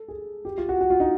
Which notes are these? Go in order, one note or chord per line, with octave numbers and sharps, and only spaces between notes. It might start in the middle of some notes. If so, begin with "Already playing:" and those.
Already playing: A4
G#4
G4
F4
F#4
F#4
F4
D#4